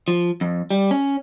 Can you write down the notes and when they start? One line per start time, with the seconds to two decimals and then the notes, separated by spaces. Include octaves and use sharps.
0.08 F3
0.41 F2
0.71 G3
0.91 C#4